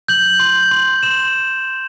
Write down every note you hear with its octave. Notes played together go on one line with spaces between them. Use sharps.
G6 F#7
C6
C6
C6 E7